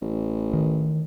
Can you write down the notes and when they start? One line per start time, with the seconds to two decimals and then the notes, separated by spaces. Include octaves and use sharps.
0.02 A1
0.53 D#3